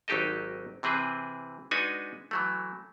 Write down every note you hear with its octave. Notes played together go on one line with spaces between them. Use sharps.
G#1 F#3 D#4 G4 A4 D#5
C3 E3 C4 G#4 B4
G#3 D4 D#4 F#4 B4 G#5
E3 F#3 A3